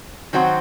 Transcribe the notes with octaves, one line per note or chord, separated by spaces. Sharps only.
D#3 F#3 C4 F#4 C5